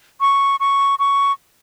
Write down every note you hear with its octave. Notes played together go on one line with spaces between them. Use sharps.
C#6
C#6
C#6